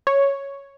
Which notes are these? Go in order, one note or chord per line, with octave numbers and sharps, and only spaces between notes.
C#5